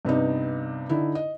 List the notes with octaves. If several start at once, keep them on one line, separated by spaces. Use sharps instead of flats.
G2 C3 B3 D#4
D3 D#4 E4
D#5